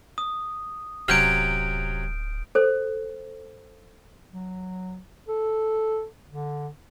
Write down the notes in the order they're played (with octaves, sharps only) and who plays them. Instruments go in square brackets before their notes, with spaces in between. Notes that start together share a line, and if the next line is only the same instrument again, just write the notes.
[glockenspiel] D#6
[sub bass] D1 [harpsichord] C3 F#3 C#4 [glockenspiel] F6 G6 D7
[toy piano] A4 C5
[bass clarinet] F#3
A4
D3